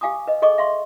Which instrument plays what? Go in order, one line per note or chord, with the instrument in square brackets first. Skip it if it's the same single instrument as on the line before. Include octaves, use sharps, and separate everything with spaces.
[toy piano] G4 F5 G#5 D6 D#6
B4 D#5
G#4 A4 D#5 C#6 D6
E5 F5 C6 C#6